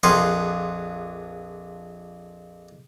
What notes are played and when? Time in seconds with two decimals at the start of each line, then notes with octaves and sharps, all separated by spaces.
0.03 A#1 F2 G#4 F5 F#5 C6